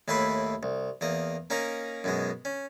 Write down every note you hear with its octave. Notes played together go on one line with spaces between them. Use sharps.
D#2 A2 E4 B4 B5 C6
C2
E2 A#3 D#5
A#3 C#4 D#4 A#4
F#2 B2 G#3
C#4